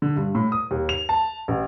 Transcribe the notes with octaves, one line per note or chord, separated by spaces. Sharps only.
D3
G2
A2
D#6
D#2
F7
A5
A1